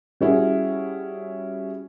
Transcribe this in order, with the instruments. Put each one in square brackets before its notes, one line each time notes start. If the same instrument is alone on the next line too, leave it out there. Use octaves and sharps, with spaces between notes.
[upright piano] G3 C#4 E4 F#4 G#4